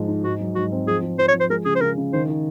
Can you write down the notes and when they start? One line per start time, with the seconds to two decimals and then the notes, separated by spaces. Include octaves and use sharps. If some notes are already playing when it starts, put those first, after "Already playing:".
Already playing: G#2 F3 G#3
0.08 D#4
0.24 G#2 F#4
0.40 F#3
0.55 G#2 F#4
0.72 C4
0.87 F3 G#4
1.02 F3
1.18 F3 C5
1.28 C#5
1.34 F3
1.40 C5
1.50 G#3 A#4
1.65 C#3 G#4
1.75 C5
1.81 C#3 A#4
1.97 C#3
2.13 D#3 C5
2.29 D#3